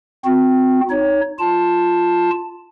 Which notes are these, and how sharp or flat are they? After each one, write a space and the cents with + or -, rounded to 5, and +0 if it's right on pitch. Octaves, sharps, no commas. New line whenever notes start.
C4 -20 F#4 -35
D#4 +0 C#5 +10
F4 +0 A5 +0